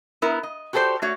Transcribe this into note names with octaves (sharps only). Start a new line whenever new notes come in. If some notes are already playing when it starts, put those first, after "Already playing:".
B3 E4 A#4
D#5
F#4 G4 A4 A#4 C5 D5
A3 F#4 C#5 D5